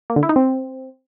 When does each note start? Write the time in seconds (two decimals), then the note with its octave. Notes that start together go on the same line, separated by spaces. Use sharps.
0.10 A#3
0.16 D3
0.23 E4
0.29 D#4
0.36 C4